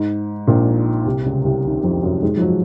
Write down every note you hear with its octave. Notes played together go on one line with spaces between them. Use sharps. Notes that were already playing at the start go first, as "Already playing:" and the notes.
Already playing: G#2
A#1 A#2
C2 C3
C#2 C#3
C2 C3
D#2 D#3
F2 F3
F#2 F#3
G#2 G#3
F3
F#3